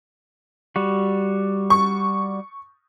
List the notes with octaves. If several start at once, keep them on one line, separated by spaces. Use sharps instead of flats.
G3 F#4
C#6